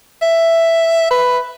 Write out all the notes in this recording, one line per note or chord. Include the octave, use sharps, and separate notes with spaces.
E5
B4